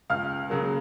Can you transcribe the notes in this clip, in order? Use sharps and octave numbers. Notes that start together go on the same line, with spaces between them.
C#2 F5 F6
C#3 F#3 A#3